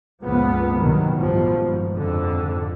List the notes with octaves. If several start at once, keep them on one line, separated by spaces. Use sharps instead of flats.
G1 C#2 A#2 F3 B3
C2 B2 D#3 F#3
A1 G2 B2 F3
G#1
F2 G#2 D3